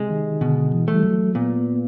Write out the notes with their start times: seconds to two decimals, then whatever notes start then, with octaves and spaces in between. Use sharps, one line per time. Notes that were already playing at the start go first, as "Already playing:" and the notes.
Already playing: C3 G#3
0.10 D#3
0.41 B2 D3
0.72 E3
0.88 A3
0.94 G3
1.03 F#3
1.35 A#2 B3